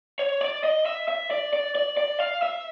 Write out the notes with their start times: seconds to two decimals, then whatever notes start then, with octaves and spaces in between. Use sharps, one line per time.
0.19 C#5
0.41 D5
0.64 D#5
0.86 E5
1.08 E5
1.31 D5
1.53 D5
1.75 D5
1.97 D5
2.20 F5
2.42 E5